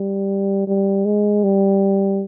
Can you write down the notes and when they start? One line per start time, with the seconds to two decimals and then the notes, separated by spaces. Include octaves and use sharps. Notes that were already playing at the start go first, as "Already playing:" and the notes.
Already playing: G3
0.67 G3
1.06 G#3
1.44 G3